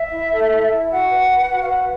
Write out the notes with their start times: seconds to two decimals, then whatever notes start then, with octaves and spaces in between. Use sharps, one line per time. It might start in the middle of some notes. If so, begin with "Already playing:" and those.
Already playing: E5
0.11 E4
0.31 A4
0.51 E4
0.71 E4
0.90 F#4 F#5
1.10 B4
1.30 B4
1.50 F#4
1.62 F5
1.69 B4 F#5